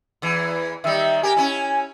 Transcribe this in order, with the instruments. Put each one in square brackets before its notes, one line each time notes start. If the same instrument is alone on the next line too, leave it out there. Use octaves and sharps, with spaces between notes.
[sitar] E2 E3
[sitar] D#3 G3 [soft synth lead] E5
[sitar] G4 A#4 [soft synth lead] G#5
[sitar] C#4 E4